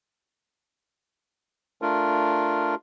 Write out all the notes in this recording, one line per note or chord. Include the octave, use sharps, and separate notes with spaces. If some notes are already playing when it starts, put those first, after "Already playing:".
A3 D4 F4 A#4